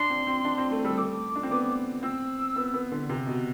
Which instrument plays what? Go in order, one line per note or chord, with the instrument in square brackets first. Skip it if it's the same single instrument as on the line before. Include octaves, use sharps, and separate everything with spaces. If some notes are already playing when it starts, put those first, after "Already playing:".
Already playing: [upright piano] D4 [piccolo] C6
[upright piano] C4
C4
D4
C4
A3
[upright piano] G3 [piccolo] E6
[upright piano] A3 [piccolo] D6
[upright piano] D4
C4
B3
[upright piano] C4 [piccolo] E6
[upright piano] B3
B3
D3
C3
B2